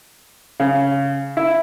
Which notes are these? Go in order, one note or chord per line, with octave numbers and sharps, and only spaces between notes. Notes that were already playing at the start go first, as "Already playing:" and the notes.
C#3
E4